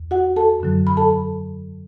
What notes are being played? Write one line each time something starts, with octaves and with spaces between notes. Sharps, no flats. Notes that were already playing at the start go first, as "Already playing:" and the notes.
Already playing: E2
F#4 F#5
A4 A5
F#2 D3 F#3
B5
A4 A5